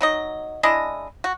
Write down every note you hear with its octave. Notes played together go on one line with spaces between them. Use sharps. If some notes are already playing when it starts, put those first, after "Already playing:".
F#3 D#4 D#5
G#3 D4 E4 D#5
F#4